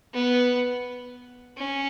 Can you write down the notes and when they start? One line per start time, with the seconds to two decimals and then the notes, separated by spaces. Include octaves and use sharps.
0.14 B3
1.57 C#4